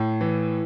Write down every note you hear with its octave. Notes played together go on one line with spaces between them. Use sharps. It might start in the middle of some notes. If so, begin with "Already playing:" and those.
Already playing: A2
E3